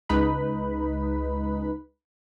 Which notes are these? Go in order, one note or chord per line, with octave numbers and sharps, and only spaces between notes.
C#2 G#3 D#4 B4 B5